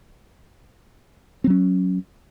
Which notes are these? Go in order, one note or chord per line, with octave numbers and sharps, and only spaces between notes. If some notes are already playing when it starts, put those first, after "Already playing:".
F#3 C4 C#4